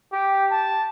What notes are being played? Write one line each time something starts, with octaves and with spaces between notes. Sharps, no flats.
G4
A5